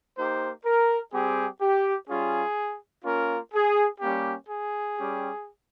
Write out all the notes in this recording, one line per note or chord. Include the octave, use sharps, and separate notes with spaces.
A#3 D#4 G4 C5
A#4
G3 C4 G4 G#4
G4
G3 C#4 F4 G#4
A#3 C#4 F4 A#4
G#4
G3 A#3 C#4 G4
G#4
G3 C#4 G4